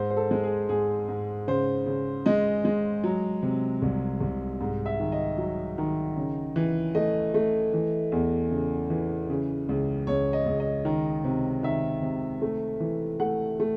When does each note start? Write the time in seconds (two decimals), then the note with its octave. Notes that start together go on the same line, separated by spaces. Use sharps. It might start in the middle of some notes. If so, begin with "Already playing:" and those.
Already playing: G#2 C5
0.10 C5
0.17 A4
0.31 G#3
0.43 G#4
0.69 G#2 G#4
1.09 G#2
1.48 C#3 C5
1.86 C#3
2.26 G#3 D#5
2.65 G#3
3.04 F#3
3.43 C3
3.82 C2
4.21 C2
4.61 G#2
4.86 E5
5.00 D#3
5.12 D#5
5.38 F#3
5.78 D#3
6.17 C#3
6.56 E3
6.95 A3 D#5
7.34 A3
7.73 E3
8.12 E2
8.51 C#3
8.90 E3
9.30 C#3
9.69 C#2
10.07 C#2 C#5
10.33 D#5
10.46 C#2
10.60 D#5
10.85 D#3
11.24 C3
11.63 D#3 E5
12.02 C3
12.42 A3
12.80 E3
13.20 A3 F#5
13.60 A3